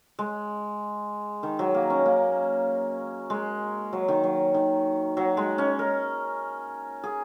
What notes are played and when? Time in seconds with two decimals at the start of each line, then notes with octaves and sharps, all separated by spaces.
0.19 G#3
1.43 D#3
1.59 F#3
1.74 A#3
1.90 C#4
2.06 A#3
3.30 G#3
3.93 F#3
4.08 D#3
4.23 F#3
4.54 D#3
5.17 F#3
5.37 G#3
5.58 C#4
5.79 A#4
7.04 G#4